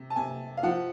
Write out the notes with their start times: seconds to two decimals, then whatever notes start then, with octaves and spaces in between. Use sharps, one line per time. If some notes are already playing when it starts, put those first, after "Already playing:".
Already playing: C3
0.10 A5
0.16 C3 G#5
0.57 F5
0.63 F3 F#5